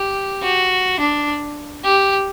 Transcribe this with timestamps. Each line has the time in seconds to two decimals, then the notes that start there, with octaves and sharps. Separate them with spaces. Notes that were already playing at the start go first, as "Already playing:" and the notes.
Already playing: G4
0.43 F#4
1.00 D4
1.84 G4